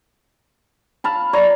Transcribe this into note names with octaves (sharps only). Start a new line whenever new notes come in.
F5 A5 B5
C#5 D5 A#5